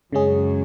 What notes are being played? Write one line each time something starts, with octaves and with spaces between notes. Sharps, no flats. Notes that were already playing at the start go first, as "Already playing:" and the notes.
F#2 C#3 G#3 C#4 G#4